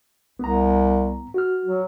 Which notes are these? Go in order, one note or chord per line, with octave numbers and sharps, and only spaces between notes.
C2 B3 A#5
F#4 F6
F#3